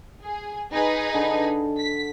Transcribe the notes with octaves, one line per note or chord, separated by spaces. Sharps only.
G#4
D#4 G#4 B4
D3
B6